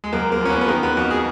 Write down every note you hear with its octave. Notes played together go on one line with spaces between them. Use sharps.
G#3
F#2 A#3
A#3
F3 C#4
B3
B3
D#3 A#3
B3
F2 F#4
G#4